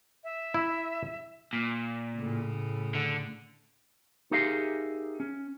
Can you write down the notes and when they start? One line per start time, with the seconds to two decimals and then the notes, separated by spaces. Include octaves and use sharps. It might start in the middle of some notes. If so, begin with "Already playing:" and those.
0.24 E5
0.54 E4
1.53 A#2
2.16 A2 C#3
2.95 D3
4.31 D#4 G4 G#4 A#4 E5 F5
5.20 C#4